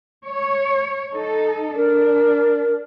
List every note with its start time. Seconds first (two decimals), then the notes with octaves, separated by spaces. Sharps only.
0.25 C#5
1.11 D#4 A4
1.76 D4 A#4